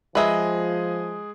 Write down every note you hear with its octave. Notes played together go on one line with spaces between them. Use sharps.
F3 G#3 G#4 B4 D#5 E5 A#5